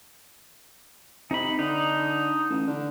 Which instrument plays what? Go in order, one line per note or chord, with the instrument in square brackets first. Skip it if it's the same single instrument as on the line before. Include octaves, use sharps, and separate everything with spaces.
[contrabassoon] C3 [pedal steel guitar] D#4 B5
[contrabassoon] D3 [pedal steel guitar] D#4
[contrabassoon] A1
D3